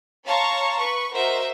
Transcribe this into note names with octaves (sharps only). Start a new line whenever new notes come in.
C#5 F5 A5 A#5 C6 C#6
B4 C#6
F#4 A#4 C5 D#5 E5